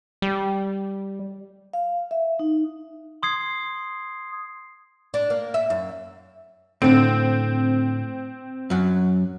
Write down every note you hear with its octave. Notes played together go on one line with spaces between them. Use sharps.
G3
F5
E5
D#4
C6 D#6 G#6 C7
D4
A#3
E5
F#2
A2 D3 C4
F#2 F#3